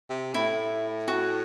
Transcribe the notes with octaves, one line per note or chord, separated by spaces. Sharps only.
C3
A2 E4
F#4